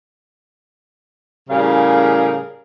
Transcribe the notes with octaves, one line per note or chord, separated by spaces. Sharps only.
A2 C#3 G3 G#4 A#4 F5